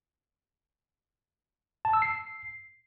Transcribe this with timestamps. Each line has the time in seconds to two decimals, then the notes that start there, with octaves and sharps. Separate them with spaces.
1.85 A5
1.93 E6
2.02 C7